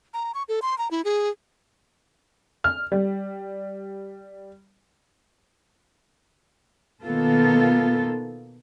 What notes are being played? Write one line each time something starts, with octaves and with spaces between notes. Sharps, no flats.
A#5
C#6
A4
C6
A#5
E4
G#4
F6
G3
B2 D#3 A#3 B3 F4 A4